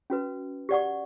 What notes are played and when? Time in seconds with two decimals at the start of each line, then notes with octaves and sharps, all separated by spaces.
0.10 C#4 F#4 B4
0.69 G4 D5 F#5 C#6